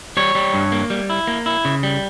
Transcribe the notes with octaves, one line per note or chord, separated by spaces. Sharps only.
G3 C#5
G3
G2
A#3
G3
E4
A#3
E4
C#3
G3